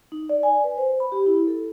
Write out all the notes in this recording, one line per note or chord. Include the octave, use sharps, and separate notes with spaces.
D#4
D5
G#5
B4
C5
B5
G4
E4
A4